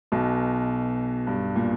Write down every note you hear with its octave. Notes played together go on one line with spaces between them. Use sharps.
B1 B2
G2
A#2